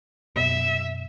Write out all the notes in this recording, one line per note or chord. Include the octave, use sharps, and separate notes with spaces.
F#2 B2 E5